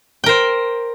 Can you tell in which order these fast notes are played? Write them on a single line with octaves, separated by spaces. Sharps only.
G5 A#4 C5